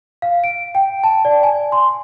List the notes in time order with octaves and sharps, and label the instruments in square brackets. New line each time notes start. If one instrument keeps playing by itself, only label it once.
[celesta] F5
D7
G5
A5
D5
G#5
C6